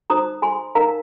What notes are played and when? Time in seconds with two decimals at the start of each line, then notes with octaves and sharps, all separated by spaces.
0.10 D#4 C5 A#5 D#6
0.42 G#5 C6
0.75 D#4 A#4 F5 A#5